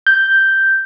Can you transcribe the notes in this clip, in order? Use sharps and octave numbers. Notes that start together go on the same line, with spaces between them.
G6